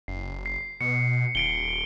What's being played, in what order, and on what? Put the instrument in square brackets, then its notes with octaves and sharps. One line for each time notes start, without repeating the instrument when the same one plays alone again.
[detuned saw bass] F#1 [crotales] C7
[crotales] C7
[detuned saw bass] B2 [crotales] C#7
[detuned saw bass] D#1 [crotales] C7 D7 G7